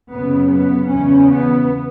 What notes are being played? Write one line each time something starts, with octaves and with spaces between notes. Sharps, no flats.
F#2 C#3 B3
B3
E2 C#3 C#4
B3